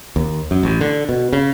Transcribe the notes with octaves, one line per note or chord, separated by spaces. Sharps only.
D#2
F#2
A1
D3
B2
C#3